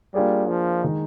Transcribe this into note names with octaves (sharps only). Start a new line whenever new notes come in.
G3 A#3 D4 F4 G#4 D5
F3
D#3 G#3 D#4